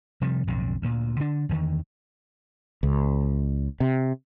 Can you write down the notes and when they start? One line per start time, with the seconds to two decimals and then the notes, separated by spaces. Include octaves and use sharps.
0.21 C3 F3 G3
0.47 B1 F2 A2 D3
0.82 D2 A#2
1.20 D3 D4
1.49 E2 D3 D#3
2.83 C#2
3.80 C3